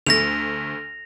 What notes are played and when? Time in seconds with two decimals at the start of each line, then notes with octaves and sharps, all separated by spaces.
0.06 D2 A3 A#6 F7